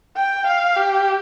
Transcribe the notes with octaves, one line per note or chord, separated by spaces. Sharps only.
G5
F5
G4